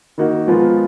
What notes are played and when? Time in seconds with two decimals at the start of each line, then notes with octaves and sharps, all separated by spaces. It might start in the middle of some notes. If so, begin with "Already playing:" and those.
0.18 D#3 A#3 D#4 F#4
0.48 F3 G#3 B3 F4 A#4